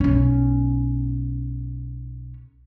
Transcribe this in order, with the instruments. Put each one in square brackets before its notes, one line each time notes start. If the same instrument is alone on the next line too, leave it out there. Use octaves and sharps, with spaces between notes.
[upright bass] B1 C#4